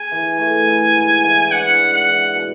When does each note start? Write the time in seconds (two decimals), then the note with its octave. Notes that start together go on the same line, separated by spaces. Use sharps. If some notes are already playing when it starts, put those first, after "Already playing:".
Already playing: G#4 G#5
0.11 E3
0.39 A3
0.67 E4
0.95 G#2
1.24 E3
1.51 D4 F#5
1.80 G#2
1.94 F#5
2.08 E3
2.35 B2